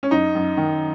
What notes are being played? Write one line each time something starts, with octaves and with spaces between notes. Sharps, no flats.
C#4
F#2 D#4
F#2
D#3